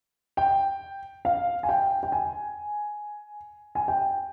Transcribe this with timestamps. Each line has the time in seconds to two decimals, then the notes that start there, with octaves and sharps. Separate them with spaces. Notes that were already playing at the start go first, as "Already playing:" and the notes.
0.37 G5
1.25 F5
1.63 G#5
1.69 G5
2.03 G5
2.12 G#5
3.75 G#5
3.88 G5